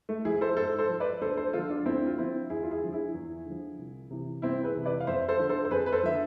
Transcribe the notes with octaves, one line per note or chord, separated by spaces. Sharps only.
A3
F3 E4 G#4
A4 C5
G#2 A4 C5
A4 C5
F3
B4 D5
D2 A4 C5
A4 C5
D3 F3 F4 A4
D4 F4
D2 C4 E4
F4
D3 F3 C4 E4
E2 E4 G#4
F4
E4 G#4
D3 F3
E4 G#4
E2
D3 F3
C2
C3 E3
C2 C4 E4
G#4 B4
C3 E3
B4 D5
F5
F2 C5 E5
A4 C5
D3 F3
A4 C5
C5
F2 G#4 B4
B4
A4 C5
D3 F3 E5